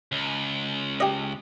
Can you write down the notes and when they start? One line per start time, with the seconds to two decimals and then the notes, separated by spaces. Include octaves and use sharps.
0.12 C#2
1.00 G4 D#5